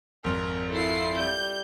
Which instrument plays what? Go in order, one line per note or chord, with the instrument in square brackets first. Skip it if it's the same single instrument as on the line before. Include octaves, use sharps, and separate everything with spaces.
[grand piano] G#1 F2 [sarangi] A#4
[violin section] E4 F4 C7 [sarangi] A4
[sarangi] G3 [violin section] G6